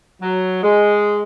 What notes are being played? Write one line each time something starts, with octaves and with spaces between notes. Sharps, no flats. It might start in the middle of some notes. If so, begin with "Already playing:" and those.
F#3
G#3